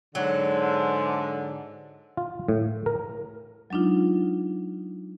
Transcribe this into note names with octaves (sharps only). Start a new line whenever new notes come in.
G#2 D3 F#3
F4
A2
A#4
F#3 G#3 D4 D#4 F4